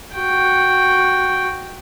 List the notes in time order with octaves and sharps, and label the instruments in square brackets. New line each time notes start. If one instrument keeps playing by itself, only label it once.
[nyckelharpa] F#4 G5